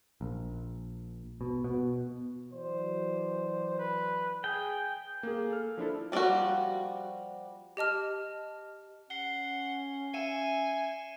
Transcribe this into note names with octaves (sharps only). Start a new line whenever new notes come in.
A#1
B2
B2
E3 F#3 C5 D5
B4
G#4 G5
A#3 G#4
A4 F6
F3 D4 E4 A4
F3 G3 A#3 F4 F#4
G4 D#5 A5 F6
C#4 F#5 C7 G7
E5 G#5 C#7 D#7 E7